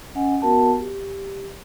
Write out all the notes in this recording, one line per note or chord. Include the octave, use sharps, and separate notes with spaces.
C#4 D#5 F#5 G#5
B3 F#4 A#4 F#5 A5
G4